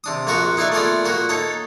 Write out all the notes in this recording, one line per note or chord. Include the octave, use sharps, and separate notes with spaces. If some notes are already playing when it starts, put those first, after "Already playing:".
C3 D4 D#6
A#1 F2 F4 F#4 A#4 C#6
D#4 E4 B4 D5 E5 F5
A3 B3 F4 G#4 A#4 D5
A#2 A#3 F#4 A#4
D#4 A4 C#5